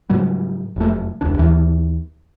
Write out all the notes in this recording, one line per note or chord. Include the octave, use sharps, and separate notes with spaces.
G#2 C#3 F#3 G3
F1 F#2 A3
E1 C#2 D4
D#2 E3